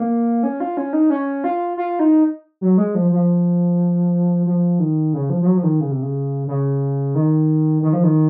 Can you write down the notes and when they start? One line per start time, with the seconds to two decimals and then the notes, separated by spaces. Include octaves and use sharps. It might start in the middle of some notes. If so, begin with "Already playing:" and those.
Already playing: A#3
0.43 C#4
0.60 F4
0.77 C#4
0.93 D#4
1.10 C#4
1.44 F4
1.77 F4
1.99 D#4
2.61 F#3
2.78 G#3
2.95 F3
3.12 F3
4.46 F3
4.79 D#3
5.14 C#3
5.30 F3
5.42 F3
5.46 F#3
5.57 F3
5.63 D#3
5.80 C#3
5.91 C3
6.02 C#3
6.47 C#3
7.15 D#3
7.82 D#3
7.93 F3
8.03 D#3